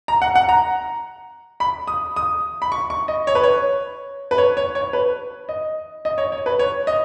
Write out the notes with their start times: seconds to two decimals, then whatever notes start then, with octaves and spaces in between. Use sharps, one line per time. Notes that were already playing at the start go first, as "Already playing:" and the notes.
0.08 A#5
0.22 F#5
0.35 F#5
0.49 A#5
1.60 B5
1.87 D#6
2.16 D#6
2.62 B5
2.72 C#6
2.90 C#6
3.08 D#5
3.27 C#5
3.35 B4
3.44 C#5
4.31 B4
4.38 C#5
4.57 C#5
4.75 C#5
4.93 B4
5.49 D#5
6.05 D#5
6.18 C#5
6.32 C#5
6.46 B4
6.59 C#5
6.87 D#5